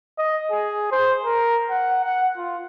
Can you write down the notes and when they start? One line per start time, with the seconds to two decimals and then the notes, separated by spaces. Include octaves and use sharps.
0.18 D#5
0.51 G#4
0.92 C5
1.25 A#4
1.70 F#5
2.05 F#5
2.37 F4